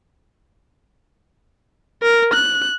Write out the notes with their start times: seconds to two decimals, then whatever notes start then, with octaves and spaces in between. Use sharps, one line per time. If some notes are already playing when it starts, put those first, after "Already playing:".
2.03 A#4
2.33 F#6